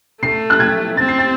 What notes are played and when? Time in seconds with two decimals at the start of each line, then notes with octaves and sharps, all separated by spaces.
0.22 A3 C7
0.50 F#6
0.60 G#6
0.97 C4 A6
1.08 C7
1.19 A6